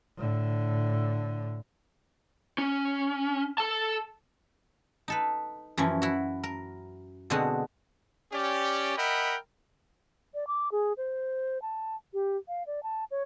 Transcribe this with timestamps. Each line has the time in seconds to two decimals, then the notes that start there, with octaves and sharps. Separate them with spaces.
0.17 A2 D3
2.58 C#4
3.58 A4 A5
5.08 D#4 A4 B4
5.77 F#2 E3 F3 C#4
6.02 E4 F#4
6.43 A#4
7.30 B2 D3 G#3 C4 F#4
8.32 C#4 G4 D5
8.97 A#4 D#5 E5 F#5 G5 B5
10.34 D5
10.47 D6
10.72 G#4
10.97 C5
11.62 A5
12.14 G4
12.48 F5
12.67 D5
12.83 A5
13.11 C#5